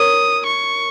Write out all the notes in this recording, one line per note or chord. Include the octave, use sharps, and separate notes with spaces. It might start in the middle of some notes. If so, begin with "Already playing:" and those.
Already playing: A#4 C#5 D#6
C#6